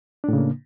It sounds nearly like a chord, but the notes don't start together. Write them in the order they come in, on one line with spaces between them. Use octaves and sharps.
D4 A2 C#3 A#3